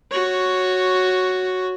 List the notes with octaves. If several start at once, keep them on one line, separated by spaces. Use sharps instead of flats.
F#4 C#5